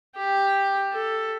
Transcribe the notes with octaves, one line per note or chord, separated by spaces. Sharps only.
G4
A4